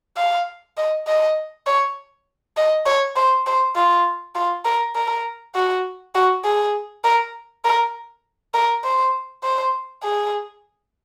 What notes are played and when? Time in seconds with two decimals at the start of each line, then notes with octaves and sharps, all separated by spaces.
0.17 F5
0.77 D#5
1.07 D#5
1.67 C#5
2.57 D#5
2.86 C#5
3.16 C5
3.47 C5
3.76 F4
4.35 F4
4.65 A#4
4.95 A#4
5.55 F#4
6.15 F#4
6.45 G#4
7.04 A#4
7.64 A#4
8.54 A#4
8.84 C5
9.43 C5
10.03 G#4